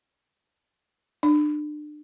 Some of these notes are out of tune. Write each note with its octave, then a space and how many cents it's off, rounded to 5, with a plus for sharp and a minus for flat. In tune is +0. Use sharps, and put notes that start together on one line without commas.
D4 +35